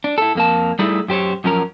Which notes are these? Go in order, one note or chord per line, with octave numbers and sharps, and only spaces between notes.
D4
E4 A4
F2 A#3 A5
G3 A3 D#4 E4 G#4 A4
F#2 G4 C5 C#5
F#2 F3 C#4 A#4